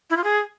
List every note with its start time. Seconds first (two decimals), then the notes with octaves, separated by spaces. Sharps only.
0.10 E4
0.17 F4
0.24 G#4